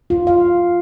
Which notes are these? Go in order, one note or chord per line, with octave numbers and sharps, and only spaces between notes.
F4
F5